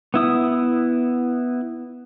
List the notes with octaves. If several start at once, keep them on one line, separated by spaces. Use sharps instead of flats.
B3 E4 D#6